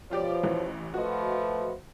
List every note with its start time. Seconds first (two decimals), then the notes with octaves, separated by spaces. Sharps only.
0.11 B2 F3 F4 G4 C#5 D5
0.43 A1 E3
0.94 F3 A3 F#4 B4 D#5